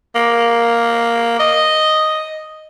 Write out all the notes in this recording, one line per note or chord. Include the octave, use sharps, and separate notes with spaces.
A#3
D#5